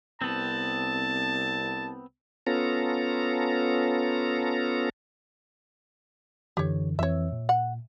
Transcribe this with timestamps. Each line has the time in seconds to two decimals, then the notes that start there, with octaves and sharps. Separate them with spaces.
0.22 C2 B3 C4 A5
2.47 B3 C#4 F4 A4 A#5
6.57 F#2 D3 E3 G4 C#5
6.99 F2 E3 C4 C#5 E5
7.32 A#2
7.49 F#5